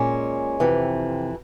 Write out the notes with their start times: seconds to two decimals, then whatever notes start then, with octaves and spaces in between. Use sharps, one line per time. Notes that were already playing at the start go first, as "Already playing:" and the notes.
Already playing: A#2 G#3 C#4
0.60 F2 C3 E3